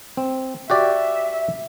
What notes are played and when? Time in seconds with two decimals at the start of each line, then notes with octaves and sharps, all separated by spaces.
0.17 C4
0.70 F#4 G4 D5 E5